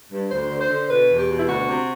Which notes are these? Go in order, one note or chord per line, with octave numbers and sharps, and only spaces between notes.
G2
D2 C5
D3
C5
D3
B2 B4
E2
G4
B2
E4
D2 F#4
C3